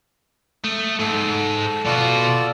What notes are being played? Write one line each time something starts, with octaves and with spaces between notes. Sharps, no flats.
A3 D#6
G#2 A4
B2 F4 F#4 A4 D5